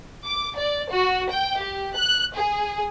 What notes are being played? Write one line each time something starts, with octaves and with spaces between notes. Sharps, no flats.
D6
D5
F#4
G5
G4
F#6
G#4